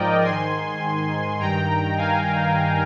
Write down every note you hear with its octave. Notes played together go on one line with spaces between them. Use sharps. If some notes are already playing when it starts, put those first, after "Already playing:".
Already playing: G#2 F3 A#4 D5 D#5 G5
G#2 D#3 G#5 C6
G2 D#3 G5 A#5
F5 G#5